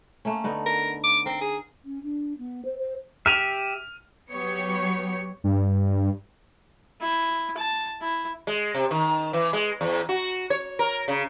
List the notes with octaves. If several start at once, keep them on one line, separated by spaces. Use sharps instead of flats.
A3 A#3 C#4
D3 B3 D#4
A#4
D6
C4 A#4
G#4
C#4
D4
B3
C5
C5
G4 E5 F6 D#7 F7
F#3 B3 G4 C#5 C#7
G2
E4
A5
E4
G#3
C3
D#3
E3
G#3
E2
F#4
C#5
A#4
C#3